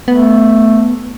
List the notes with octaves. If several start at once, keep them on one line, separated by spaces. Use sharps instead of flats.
A3 B3